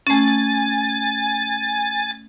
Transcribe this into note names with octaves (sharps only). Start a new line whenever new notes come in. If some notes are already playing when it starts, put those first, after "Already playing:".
A3 C#4 G#5 A6